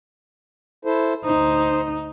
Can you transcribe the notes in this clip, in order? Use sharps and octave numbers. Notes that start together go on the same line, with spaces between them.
E4 A4 C5
D2 D#4 C5